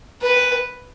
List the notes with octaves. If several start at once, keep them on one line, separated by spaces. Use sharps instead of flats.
B4